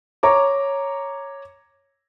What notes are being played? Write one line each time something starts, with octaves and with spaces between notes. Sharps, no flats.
C#5 A#5 D6